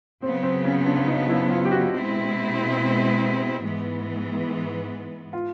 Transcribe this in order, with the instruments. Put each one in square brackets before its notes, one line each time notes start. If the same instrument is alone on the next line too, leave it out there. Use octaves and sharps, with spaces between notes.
[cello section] C#3 F#3 B3 [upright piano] C4
[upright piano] C4
C#4
D4
D#4
E4
F4
G4
F#4
[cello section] B2 G#3 C4 E4
G#2 E3 G#3 B3
[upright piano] F4